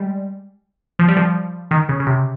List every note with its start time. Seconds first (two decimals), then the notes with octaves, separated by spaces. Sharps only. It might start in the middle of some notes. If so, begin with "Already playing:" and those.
Already playing: G3 G#3
0.99 F3
1.08 G3
1.17 F3
1.71 D#3
1.89 C#3
2.00 C#3
2.07 C3